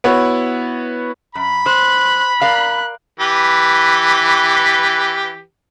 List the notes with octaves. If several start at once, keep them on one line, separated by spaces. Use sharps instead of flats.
B3 E4 F#4 B4 C#5
F#2 B5
C5 F#6
A#4 D5 F5 F#6
E3 G4 B4